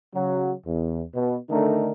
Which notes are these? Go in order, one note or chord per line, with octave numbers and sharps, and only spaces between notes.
C#3 F#3
E2
B2
D3 D#3 A3 D4 D#4 A#4